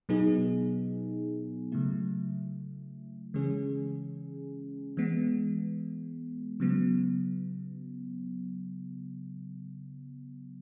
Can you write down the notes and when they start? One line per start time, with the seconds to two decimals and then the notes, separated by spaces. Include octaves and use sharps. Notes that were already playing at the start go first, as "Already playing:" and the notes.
0.09 B2 F#3 B3 D#4 G#4
1.72 C#3 F#3 A3 E4
3.34 C#3 E3 G#3 C#4 G#4
4.97 E3 G#3 B3
6.60 C#3 F#3 B3